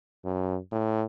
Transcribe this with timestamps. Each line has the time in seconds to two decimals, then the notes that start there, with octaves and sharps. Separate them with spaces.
0.25 F#2
0.72 A2